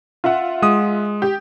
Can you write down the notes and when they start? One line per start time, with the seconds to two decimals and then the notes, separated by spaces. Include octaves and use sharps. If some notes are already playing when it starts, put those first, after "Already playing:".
0.24 F4 E5 F#5
0.62 G#3 D#6
1.22 G4